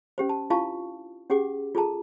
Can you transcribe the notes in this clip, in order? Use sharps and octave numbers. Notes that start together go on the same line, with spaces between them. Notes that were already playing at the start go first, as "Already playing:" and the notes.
C#4 G4 C5
A5
D4 E4 F4 F5 A5 C#6
C#4 G4 G#4 F#5 D6
F4 G#4 A4 A5 A#5